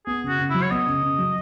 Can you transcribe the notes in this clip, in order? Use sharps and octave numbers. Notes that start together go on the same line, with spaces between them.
B3 G#4
C#3 F#4
C#3
F#3 E4
C#5
B3 D#5
C#3
C#3
F#3